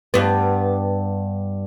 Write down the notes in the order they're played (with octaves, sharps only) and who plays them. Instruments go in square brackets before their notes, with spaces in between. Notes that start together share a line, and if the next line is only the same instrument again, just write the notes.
[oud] G2 B3